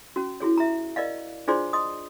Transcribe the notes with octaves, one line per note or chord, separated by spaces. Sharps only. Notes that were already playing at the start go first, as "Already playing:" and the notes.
C#4 F#4
E4 F#4 G#4 C#5
E5 A#5
A#4 D5 D#5 F5
D4 F4 G#4 C5 D5 C6
D#5 C6 D#6